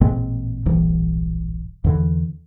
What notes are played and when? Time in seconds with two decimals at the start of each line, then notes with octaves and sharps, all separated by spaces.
0.01 A1 A#2 G#3 C4
0.66 D1 A#1 G2 E3
1.84 E2 D3 E3